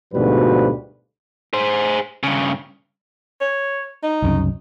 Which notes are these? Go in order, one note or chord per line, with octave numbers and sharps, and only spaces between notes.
D2 G#2 B2 F3 G3 B4
G#4 C5
G2 C#3
C#5
D#4
C2 F#2 C#3